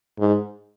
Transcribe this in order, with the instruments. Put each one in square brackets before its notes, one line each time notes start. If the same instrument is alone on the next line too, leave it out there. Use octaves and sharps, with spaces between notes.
[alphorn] G#2